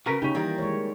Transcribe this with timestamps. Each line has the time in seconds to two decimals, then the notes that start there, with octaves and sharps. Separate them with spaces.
0.06 C#3 F#4 A#4 B4
0.22 C#3 C#4 D#4 G4
0.35 D#3 E3 G3 A#3
0.58 G#3 C#5